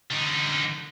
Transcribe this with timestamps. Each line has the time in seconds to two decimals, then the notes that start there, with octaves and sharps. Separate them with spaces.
0.11 D3 D#4